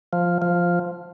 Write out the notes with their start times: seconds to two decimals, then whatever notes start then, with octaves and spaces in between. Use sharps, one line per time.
0.13 F3
0.42 F3